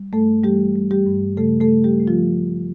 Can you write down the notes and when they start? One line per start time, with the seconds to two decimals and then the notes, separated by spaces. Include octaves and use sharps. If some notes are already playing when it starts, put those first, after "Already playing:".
Already playing: G3
0.13 G2 A3 A4
0.44 E3 G3 G4
0.76 G3
0.91 G3 G4
1.06 G2
1.37 C#3 A3 A4
1.60 A3 A4
1.69 C#3
1.84 G3 G4
2.00 A3
2.07 F3 F4
2.31 A3